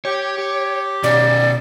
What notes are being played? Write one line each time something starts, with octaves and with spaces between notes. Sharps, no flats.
G4 C#5
G4
B2 C#4 C#5 D5